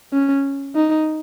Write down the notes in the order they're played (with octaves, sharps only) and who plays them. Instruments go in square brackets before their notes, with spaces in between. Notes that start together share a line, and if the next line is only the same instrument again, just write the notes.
[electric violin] C#4
D#4